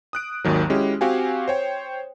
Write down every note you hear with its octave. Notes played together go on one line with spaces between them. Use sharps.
D#6 F#6 D7
G#1 D#2 D#3 F#3
G#3 C#4 E4 F#4 G4
C4 F#4 G4 F5 F#5 G#5
C5 C#5 G5